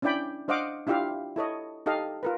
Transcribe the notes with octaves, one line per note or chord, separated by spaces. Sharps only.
C#4 D4 E4 D5 G5 B5
D4 C5 D#5 F5 F#5 D6
D4 E4 F4 G4 E5 F5
E4 A4 C#5 D#5
D#4 G4 A4 D#5 F5
F4 A#4 B4